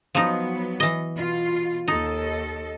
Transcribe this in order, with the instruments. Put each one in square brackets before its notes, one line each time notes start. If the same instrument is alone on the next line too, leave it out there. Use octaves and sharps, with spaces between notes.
[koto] F3 D#4 [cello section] F#3 B3
[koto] E3 D#5
[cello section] B2 F4
[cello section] D#2 A4 D#5 [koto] D#4